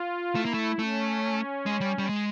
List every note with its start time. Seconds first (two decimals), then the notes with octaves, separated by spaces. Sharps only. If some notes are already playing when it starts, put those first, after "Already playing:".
Already playing: F4
0.35 A3 E4
0.45 A#3
0.54 A3
0.78 A3 C#4
1.66 G#3
1.81 G3
1.98 G3
2.09 G#3